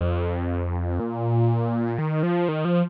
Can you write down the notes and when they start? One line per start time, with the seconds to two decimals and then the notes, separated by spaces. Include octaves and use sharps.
0.01 F2
1.00 A#2
1.98 D#3
2.23 F3
2.48 D#3
2.65 F3